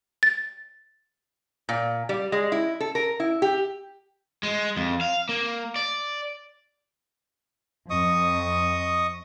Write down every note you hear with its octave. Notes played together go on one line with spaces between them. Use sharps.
A6
A#2
G3
G#3
E4
A4
A#4
E4
G4
G#3
F2
F5
A#3
D5
F2 D#5 C#6 D#6